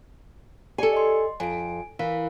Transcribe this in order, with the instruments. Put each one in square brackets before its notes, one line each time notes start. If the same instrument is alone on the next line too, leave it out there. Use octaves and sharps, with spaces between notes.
[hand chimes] G4 D5 C#7 [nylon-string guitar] A4 G#5
[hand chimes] D#5 C6
[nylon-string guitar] F2 [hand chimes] G#5 D7
[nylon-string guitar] E3 [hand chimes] A#4 F5